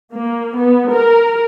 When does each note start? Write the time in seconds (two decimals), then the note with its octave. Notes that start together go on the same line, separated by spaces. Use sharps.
0.12 A#3
0.55 B3
0.89 A#4